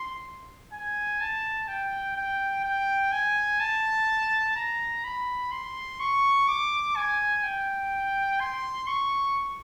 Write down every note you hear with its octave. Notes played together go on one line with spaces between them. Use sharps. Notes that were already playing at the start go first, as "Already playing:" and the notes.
Already playing: C6
G#5
A5
G5
G5
G5
G#5
A5
A#5
B5
C6
C#6
D6
G#5
G5
C6
C#6